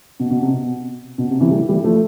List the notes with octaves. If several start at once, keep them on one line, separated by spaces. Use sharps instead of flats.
B2
B2
C3
B2
B2
C3
C3 E3
E3 G3
E3 G3
F3 A3